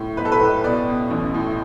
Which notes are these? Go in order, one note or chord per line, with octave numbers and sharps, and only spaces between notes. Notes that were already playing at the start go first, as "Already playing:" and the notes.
Already playing: A2
B1 B4
A4
B4
A2
B2 D5
B2
A1
A2